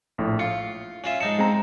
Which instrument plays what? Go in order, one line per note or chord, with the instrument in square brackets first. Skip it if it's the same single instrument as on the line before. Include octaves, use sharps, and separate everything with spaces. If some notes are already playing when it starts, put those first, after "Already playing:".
[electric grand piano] A#1 A2
[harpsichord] F4 [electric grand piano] C#7
[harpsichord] C#4 F4 E5
[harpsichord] G#2 D#4 A5 [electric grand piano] C#7
[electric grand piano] G#3 C4 A#5